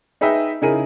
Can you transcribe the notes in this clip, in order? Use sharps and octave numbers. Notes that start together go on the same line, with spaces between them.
D#4 G#4 B4 D#5 E5 G5
C#3 D#4 E4 G#4 A#4 D#7